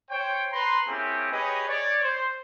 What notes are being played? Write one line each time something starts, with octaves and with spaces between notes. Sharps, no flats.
C5 C#5 G5
B4 A#5 C6
A#3 C4 C#4 E4 G4 G#4
G4 G#4 B4 C#5 D#5
C#5 D5
C5